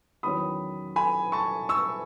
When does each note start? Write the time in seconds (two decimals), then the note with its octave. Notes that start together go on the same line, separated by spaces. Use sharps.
0.23 E2 D#3 F#3 C#4 B5 D#6
0.96 G#5 B5
1.32 A5 C#6
1.69 C#6 E6